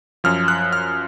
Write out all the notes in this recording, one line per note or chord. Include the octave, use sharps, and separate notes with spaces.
F#2 F3 F6
F#6
F6